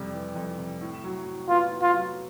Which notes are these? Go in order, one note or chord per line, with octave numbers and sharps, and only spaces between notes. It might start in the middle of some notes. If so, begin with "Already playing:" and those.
Already playing: F2 C3 G3
E3
F2
C3
A2
F#3
A2
B3 F4
A2
F4
F#3